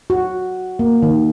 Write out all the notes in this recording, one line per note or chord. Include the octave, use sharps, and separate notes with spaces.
F#4
A#3
D#3